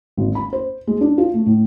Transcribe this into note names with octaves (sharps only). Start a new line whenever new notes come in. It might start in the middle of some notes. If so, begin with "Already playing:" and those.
G#1
B5
C5
G#3
D4
F4
A3
A2